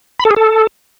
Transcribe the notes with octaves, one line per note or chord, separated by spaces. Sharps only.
B5
A4
G#4
A4